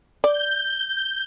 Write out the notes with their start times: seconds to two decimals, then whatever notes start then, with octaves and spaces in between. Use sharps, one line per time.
0.24 D5 G6